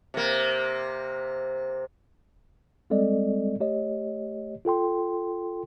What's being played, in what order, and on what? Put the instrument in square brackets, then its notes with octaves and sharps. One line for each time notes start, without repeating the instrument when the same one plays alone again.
[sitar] C3 A#3
[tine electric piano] G3 G#3 C4 A4 D5 D#5
A3 G4 C#5 D#5
F4 A4 G5 C6